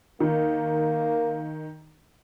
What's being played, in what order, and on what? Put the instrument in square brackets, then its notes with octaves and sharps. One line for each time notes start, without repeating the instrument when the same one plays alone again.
[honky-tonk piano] D#3 [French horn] A#3